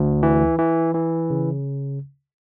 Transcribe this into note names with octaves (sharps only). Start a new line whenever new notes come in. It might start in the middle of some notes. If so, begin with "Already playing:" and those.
Already playing: D2
E3
E3
E3
C#3